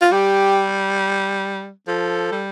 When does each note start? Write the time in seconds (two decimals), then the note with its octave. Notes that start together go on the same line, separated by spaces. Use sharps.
0.02 F4
0.12 G3 G4
1.88 F3 A4
2.32 G3